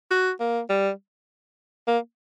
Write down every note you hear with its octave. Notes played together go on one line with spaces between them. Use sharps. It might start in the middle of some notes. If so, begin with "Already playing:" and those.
F#4
A#3
G3
A#3